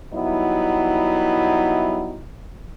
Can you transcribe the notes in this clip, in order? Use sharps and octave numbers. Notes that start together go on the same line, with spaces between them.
F#3 G3 B3 D#4 E4